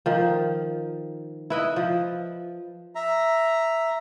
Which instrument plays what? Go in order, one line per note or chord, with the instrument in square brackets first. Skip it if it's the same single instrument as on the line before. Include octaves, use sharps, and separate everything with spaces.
[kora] D#3 F3
E4 B4 D#5
F3
[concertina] E5 A#5